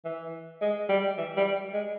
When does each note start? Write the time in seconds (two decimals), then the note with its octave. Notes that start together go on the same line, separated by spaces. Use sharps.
0.05 E3
0.62 G#3
0.89 G3
1.18 E3
1.37 G3
1.74 G#3